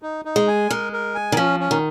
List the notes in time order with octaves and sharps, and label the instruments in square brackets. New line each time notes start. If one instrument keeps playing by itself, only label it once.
[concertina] D#4
D#4
[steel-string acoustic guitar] G#3
[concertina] G#5
[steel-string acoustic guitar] G#3 [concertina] A#4
[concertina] A#4
G#5
[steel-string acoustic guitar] D#3
[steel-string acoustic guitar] F3 [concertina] C#4
[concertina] C#4
[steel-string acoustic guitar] D#3